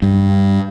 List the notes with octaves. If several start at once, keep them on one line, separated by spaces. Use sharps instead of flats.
G2